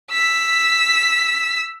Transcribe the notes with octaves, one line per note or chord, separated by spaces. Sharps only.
E6 B6